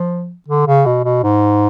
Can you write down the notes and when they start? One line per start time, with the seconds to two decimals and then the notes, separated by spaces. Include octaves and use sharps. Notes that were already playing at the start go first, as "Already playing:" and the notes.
Already playing: F3
0.48 D3
0.67 C#3
0.86 B2
1.04 B2
1.23 G#2